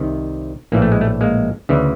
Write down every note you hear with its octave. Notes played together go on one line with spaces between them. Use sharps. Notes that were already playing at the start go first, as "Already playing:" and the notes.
Already playing: C2 C3 D#3
A#1 A2 E3 A#3
A3
G#3
A3
G#3 A#3
D2 C#3 E3